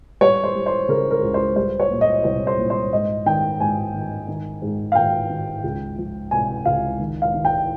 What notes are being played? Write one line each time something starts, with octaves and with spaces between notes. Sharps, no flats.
G3 C#5
C5
G3
C5
C#3 A#4
A#4
C#2
C5
G3 C5
C#5
A#2
D#5
C2 C#5
C5
A#2
C5
G#2 D#5
D#3 G5
G#2 G#5
D#3
D#3
G#2
F5
D#3 G5
D#3
C#2
F3
C3 G#5
C#2 F5
D#3
F5
D#3
G5